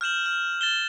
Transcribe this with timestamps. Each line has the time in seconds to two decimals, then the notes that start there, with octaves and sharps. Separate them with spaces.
0.01 F6 G6 E7 F#7
0.26 F6
0.61 A6 E7 G7